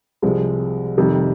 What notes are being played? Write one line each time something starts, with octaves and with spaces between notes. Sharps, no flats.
C2 C3 F3 G#3
F2 C3 D#3 G3